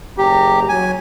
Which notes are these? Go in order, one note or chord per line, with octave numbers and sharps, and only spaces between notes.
F#1 G4 G#4 A#5
F#3 G#5